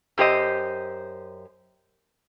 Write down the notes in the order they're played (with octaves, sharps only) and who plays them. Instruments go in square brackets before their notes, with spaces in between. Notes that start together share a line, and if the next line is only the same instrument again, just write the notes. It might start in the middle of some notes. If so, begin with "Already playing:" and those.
[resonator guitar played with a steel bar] F#2 G4 C5 D#5